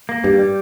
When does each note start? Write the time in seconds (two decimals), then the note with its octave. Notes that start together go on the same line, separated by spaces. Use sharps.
0.09 A#3
0.24 G2 G3
0.39 G3